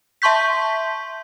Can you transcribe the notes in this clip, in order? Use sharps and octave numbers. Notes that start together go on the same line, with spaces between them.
E5 A5 C6 C#6 G6 B6